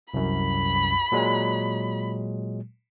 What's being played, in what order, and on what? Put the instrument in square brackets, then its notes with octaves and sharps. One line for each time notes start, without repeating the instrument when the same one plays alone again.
[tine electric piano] C2 F#2 [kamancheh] B5
[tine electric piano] A#2 F#3 G#3